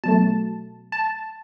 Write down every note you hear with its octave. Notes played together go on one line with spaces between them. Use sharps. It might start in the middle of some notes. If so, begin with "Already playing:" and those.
B2 F#3 A3 A5
A5